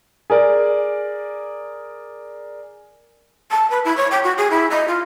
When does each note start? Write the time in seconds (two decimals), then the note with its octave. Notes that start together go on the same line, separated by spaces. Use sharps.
0.30 G#4 A#4 D5
3.51 A5
3.70 B4
3.85 E4
3.97 C#5
4.11 G5
4.24 F#4
4.38 G#4
4.51 E4
4.70 D#5
4.88 F4